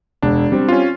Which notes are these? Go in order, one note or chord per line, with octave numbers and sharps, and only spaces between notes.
E1 D4
G3 C4
C#4 F4